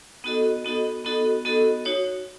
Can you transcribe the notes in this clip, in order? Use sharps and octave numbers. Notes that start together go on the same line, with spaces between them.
B3 D#4 F#4 A4 D#5
B3 D#4 F#4 A4 D#5
B3 D#4 F#4 A4 D#5
B3 D#4 F#4 A4 D#5
D#4 F#4 C#5